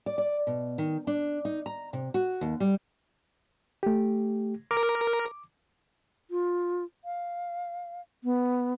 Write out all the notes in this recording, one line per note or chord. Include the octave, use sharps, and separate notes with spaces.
D5
D5
B2
D#3
D4
D#4
A#5
C3
F#4
D#2
G3
A3 G4
A#4 D6
F4
F5
B3